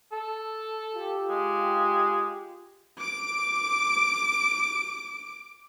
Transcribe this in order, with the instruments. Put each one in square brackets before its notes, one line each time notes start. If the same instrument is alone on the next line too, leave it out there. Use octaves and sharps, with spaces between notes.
[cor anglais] A4
[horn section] F4 G4
[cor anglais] G#3
[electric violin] D6 D7